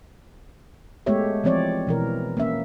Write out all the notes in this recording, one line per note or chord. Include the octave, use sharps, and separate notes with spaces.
G#3 A3 B3 G4 C#5 E5
E3 F3 C4 C#5 D5
B2 E3 A#4
A#3 C#4 E5